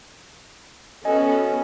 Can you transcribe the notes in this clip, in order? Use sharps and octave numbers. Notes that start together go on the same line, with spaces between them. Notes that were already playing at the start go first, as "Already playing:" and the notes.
B3 C#4 F#4 A4 D#5 G#5